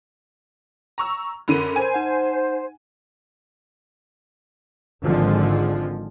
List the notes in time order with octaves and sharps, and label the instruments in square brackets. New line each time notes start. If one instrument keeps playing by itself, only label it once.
[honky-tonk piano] A#5 C#6 E6
[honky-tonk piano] F#2 D3 D#7 [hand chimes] A#4 B5
[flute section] C5 [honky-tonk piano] G#5
[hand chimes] D#4 F#5
[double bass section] G#1 D3 F3 G#3